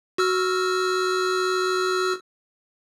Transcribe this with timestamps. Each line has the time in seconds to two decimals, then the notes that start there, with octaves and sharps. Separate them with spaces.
0.18 F#4 E6 F6